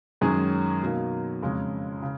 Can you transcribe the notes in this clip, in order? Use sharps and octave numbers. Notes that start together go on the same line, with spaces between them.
F#2 D#3 G#3 C#4 G#4
B2 F#3 A#3 D#4
F2 C#3 G#3 C#4
C#3